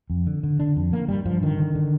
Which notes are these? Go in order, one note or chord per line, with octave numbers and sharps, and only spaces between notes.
F2
D3
D3
D3 D4
F2
D3 A#3
G2 G3
G2 F3
D3 D#3
D3
D3